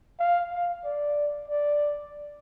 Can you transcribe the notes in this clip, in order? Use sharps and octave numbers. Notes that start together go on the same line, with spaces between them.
F5
F5
D5
D5